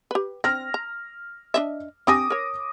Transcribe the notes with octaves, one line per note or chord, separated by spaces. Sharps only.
G4 B4
C4 F6 A#6
A#5
D4 D#5 E5
C4 G4 G#5 D6 D#6 A#6
A#4 C#5